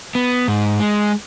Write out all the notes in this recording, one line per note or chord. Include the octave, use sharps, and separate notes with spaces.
B3
G#2
G#3